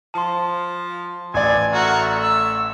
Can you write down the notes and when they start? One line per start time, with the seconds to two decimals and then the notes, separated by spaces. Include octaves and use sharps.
0.14 F3 A5 C6
1.34 A1 D5 G#5
1.73 A3 F#4 A#4
2.20 E6